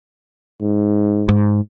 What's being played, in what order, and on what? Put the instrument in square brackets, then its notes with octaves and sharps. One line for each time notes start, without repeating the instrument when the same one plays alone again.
[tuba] G#2
[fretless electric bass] G#2